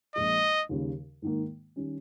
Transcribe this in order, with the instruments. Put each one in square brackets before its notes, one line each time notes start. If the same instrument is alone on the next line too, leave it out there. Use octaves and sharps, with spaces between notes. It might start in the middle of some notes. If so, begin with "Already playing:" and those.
[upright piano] A#1 A#2 G#3 [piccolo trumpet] D#5
[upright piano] D#2 C#3 G3
G#2 D#3 A#3
D#3 G3 C#4